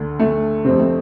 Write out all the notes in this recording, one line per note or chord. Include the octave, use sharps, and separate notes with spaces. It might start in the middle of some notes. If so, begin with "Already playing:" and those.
Already playing: D2 D3
A3
F2 C3 C4
A3